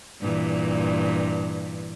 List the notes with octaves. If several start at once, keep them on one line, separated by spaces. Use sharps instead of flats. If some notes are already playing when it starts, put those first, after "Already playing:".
G2 A#2 E3